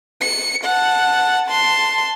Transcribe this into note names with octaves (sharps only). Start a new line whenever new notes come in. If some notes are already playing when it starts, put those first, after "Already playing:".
C#7
F#5 A5
A5 C6